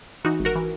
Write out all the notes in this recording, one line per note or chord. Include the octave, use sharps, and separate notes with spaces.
E3 D#4 F#4
G#1
F#4 A#4
E3